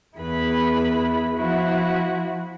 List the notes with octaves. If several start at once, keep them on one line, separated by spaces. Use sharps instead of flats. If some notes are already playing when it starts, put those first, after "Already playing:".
E2 E4 G#4 B4 B5
F3 E4 F#4